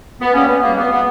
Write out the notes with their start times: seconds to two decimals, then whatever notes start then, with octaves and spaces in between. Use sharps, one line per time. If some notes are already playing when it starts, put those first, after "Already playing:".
0.20 B3
0.33 C#2 C#3 G3 A#3 C#4
0.47 B3
0.62 C#2 B2 G3 A#3
0.76 B3
0.90 B2 A#3 B3